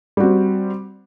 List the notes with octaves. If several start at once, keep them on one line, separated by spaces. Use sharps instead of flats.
G3 C4 F#4